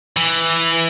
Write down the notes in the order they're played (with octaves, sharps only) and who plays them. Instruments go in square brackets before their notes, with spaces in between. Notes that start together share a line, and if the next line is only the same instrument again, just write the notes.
[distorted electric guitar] E3